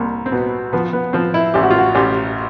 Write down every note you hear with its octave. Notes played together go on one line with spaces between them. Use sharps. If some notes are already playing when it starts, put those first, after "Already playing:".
Already playing: C2 A#3
C4
B2 B3
F3 B3
B3
F3 C4
E4
A1 G4
F#4
F4
F#4
A1 G4